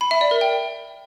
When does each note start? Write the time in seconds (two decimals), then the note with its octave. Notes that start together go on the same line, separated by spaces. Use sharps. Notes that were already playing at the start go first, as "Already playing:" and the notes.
0.01 B5
0.11 E5
0.21 D5
0.31 A#4
0.41 G5